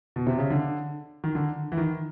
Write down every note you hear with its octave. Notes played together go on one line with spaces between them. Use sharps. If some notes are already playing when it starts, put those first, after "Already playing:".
B2
C3
C#3
D3
D#3
D3
E3
D#3